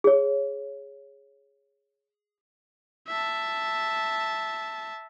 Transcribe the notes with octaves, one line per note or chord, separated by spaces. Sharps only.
G#4 C#5
E5 A5